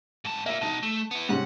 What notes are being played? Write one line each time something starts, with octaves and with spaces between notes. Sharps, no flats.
G#2 A5
A#3 F4 E5
B2 D#4 A5
A3
B3 E4
G#2 C3 C#4 F#5